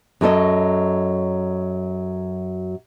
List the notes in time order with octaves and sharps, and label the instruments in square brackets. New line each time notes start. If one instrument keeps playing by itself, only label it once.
[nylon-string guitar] F#2 F#3 A4 D#5